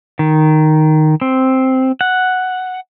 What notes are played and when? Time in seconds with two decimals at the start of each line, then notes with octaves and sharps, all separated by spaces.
0.19 D#3
1.21 C4
2.01 F#5